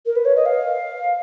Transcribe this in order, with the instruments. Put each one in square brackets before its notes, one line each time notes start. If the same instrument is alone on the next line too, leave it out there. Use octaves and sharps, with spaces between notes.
[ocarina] A#4
B4
C#5
D#5
F5